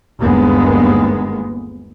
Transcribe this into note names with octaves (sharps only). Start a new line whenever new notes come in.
G1 D#2 G#3 A#3 B3